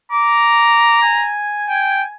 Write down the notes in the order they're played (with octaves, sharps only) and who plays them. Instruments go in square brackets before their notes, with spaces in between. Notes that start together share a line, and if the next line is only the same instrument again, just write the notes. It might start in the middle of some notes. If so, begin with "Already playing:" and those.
[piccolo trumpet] A#5 [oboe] D6
[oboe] G#5
[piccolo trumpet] G5